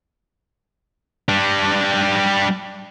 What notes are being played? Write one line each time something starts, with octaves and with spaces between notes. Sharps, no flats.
G3 D4